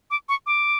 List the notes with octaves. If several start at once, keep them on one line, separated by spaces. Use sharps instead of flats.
D6
C#6
D6